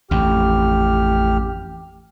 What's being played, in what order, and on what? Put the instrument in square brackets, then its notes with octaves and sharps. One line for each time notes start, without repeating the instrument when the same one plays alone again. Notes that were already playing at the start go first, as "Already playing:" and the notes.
[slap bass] A1 F2 [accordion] G4 F6